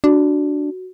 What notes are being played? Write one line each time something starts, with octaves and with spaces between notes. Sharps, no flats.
D4 F#4